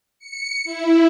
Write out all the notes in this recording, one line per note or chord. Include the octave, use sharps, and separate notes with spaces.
C#7
E4